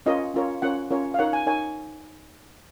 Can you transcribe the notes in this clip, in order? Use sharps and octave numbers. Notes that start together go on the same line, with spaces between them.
C#4 F4 A#4 C#5 D#5
C#4 F4 A#4 C#5
C#4 F4 A#4 C#5 F#5
C#4 F4 A#4 C#5
F5
D#4 A#4 C#5 F#5
G#5
D#4 A#4 C#5 G#5